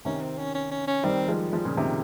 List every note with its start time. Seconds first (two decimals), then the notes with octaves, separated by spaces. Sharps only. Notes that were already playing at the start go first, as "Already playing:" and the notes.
0.05 C3 D#3 C#4
0.22 C4
0.38 C#4
0.55 C#4
0.71 C#4
0.88 C#4
1.03 D#3 G3 C4
1.28 F3 G#3
1.52 F3 G#3
1.65 A#2 C#3
1.77 C3 D#3